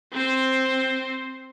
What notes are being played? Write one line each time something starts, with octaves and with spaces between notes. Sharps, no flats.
C4 C5